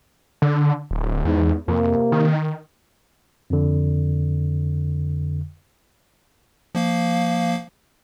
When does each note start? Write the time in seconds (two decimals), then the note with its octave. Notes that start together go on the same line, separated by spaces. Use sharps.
0.42 D3
0.91 D1
1.25 E2 G#2
1.68 F2 C3 A#3
2.12 D#3
3.50 F2 D3
6.75 F3 A#3 F5